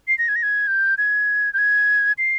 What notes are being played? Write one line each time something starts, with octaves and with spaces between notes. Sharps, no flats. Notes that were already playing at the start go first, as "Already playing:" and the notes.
C7
A#6
G#6
A#6
G#6
G6
G#6
G6
G#6
C7